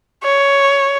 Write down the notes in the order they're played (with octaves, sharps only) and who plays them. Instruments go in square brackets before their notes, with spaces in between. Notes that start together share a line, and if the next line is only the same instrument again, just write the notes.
[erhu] C#5